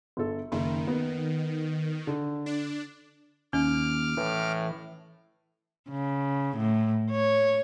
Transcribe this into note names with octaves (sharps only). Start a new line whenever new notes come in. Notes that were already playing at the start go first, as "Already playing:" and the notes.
G1 A4
F#1 D#3
B3
D3
D4
D#2 C#4 D6 F6
A2 E3
C#3
A2
C#5